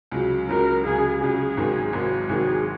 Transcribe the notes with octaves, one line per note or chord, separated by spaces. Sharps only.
C#2 C#3 F#3
C#2 C#3 F#3 A#4
C#2 C#3 F#3 G#4
C#2 C#3 F#3 G#4
G#1 G#2 D#3 F#3
G#1 G#2 D#3 F#3
G#1 G#2 D#3 F#3 G#4